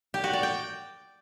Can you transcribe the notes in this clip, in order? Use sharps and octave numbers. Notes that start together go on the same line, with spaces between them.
G4
F#4
D5
G5